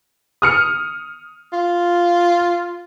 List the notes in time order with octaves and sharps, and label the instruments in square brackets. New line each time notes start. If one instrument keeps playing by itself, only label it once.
[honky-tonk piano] D#6 F6 C#7
[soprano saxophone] F4